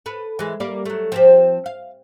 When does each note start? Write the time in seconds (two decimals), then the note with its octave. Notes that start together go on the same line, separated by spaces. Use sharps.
0.06 A4 B4
0.39 E3 G#3
0.60 G3 A#3 D5
0.85 F#3 A3
1.12 F3 C4 G4
1.66 F5